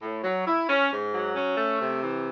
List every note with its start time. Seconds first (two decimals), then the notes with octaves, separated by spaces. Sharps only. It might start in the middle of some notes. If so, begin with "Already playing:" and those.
0.02 A2
0.23 F#3
0.47 E4
0.69 C#4
0.90 G#2
1.13 F#3
1.35 C#4
1.57 A3
1.80 C3
2.02 E3